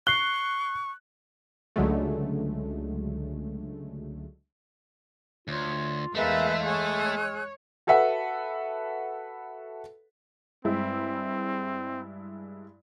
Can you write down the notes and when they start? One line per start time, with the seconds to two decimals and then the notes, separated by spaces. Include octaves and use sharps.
0.07 C#6 F#6 C7 G7
1.76 C#2 D3 F#3 G#3 A3
5.48 D2 F4 C#5
6.15 E2 G#3 A3 G#4 A#4 B4 E5 F5
6.63 G#4 C#5 E6 F#6
7.87 F#4 A4 B4 E5 F#5
10.65 G2 G#3 C4 E4